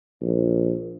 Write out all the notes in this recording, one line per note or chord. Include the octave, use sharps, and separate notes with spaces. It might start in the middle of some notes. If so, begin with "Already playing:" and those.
A#1